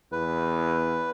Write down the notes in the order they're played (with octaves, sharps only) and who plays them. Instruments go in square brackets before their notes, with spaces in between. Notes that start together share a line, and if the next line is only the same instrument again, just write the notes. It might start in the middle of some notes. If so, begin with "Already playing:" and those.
[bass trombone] E2 [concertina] B4